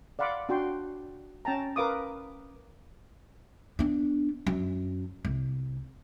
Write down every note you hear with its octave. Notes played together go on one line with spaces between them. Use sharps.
D5 F5 F#5 B5 C6 D6
D4 F#4 G5 C6
C#4 G5 A5 A#5
A#4 B4 F5 D6 D#6
B3 D4
F#2
C2